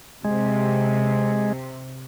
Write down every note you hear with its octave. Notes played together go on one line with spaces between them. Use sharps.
C3 G#3